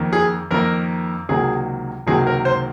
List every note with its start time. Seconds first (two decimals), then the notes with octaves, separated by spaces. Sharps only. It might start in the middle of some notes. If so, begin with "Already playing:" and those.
Already playing: F2 D#3 A#3
0.13 G#4
0.51 F2 D#3 A#3 A#4
1.29 C#2 C3 D#3 F#3 A#3 G#4
2.07 C#2 C3 D#3 F#3 A#3 G#4
2.27 A#4
2.45 C5